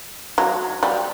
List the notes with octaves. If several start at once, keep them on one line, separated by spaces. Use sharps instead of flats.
F#3
G3